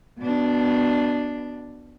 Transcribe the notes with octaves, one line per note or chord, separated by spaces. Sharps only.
B2 D4